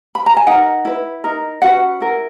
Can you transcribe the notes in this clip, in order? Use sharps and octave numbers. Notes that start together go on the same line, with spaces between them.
B5
A#5
G#5
D#4 A#4 F#5
E4 B4
D#4 A#4
C#4 F#4 B4 F#5
E4 A#4